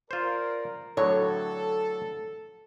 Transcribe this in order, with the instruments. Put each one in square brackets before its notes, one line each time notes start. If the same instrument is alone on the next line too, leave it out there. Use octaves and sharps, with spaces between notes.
[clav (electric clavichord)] F4 C5 [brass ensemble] A#4 D5
[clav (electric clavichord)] A2 D3 F#3 [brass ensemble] A4 [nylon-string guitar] C#5